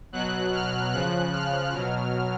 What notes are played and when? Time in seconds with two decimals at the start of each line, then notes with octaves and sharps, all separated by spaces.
0.12 B2 F#3 F#6
0.53 F6
0.93 C#3 F3 F#6
1.33 F6
1.73 B2 F#3